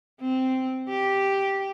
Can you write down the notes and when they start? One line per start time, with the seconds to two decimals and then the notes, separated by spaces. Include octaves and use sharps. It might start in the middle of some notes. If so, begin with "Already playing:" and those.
0.21 C4
0.89 G4